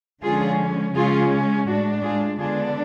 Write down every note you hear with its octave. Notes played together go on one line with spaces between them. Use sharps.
D3 F3 G#3 C#4 F4 G#4
C#3 G#3 C#4 F4 G#4
A2 G#3 D4 F#4
F4 G#4
D3 G#3 B3 D4 F4 G#4